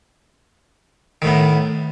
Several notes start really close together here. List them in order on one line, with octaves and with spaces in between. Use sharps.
D#3 A2 B3